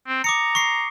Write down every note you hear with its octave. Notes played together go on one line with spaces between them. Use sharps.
C4
A#5 D6 D#6 C#7
C#6 C7